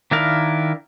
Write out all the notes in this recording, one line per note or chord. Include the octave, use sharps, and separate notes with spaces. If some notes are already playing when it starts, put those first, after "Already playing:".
D#3 D4 E4 A#4 F5